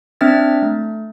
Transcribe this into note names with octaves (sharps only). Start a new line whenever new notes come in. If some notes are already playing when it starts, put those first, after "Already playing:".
C4 D4 E5 F6 A6
A3